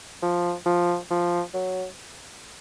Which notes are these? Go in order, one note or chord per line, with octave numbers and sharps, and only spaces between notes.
F3
F3
F3
F#3